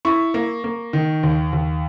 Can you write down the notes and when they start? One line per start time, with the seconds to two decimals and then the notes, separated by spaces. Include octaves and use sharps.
0.05 E4 C#6
0.34 A#3
0.64 A#3
0.93 D#3
1.23 D#2
1.53 D#2